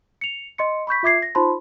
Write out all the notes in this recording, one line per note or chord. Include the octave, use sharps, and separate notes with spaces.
C#7 F7
D#5 C6 C#7
B5 C#6 G6 B6
F4 E5 D6 G#6 C7
A#6
D#4 F4 C5 A5 B5 C6